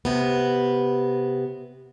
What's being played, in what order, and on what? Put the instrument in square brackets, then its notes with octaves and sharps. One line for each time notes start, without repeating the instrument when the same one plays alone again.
[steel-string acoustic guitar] C3 B3